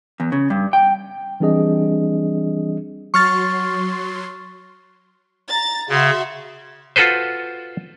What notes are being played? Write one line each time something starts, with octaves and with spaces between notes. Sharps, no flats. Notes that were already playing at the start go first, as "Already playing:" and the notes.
E2
C#3
G2
G5
E3 G3 C4 D4 G#4 D#5
F#3 C6 C#6 F6 A6
A#5 A6
C#3 F#4 E5 C6
F4 F#4 A4 B4 C5